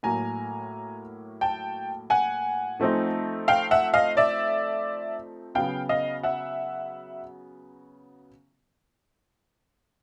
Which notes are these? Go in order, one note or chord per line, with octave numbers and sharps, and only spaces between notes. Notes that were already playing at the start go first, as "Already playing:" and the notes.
A2 F#3 A#3 G#5 A#5
G5 A5
F#5 G#5
F3 A3 C4 D#4
F5 G5
E5 F#5
D#5 F5
D5 E5
C#3 F#3 B3 F5 G5
D#5 F5
E5 F#5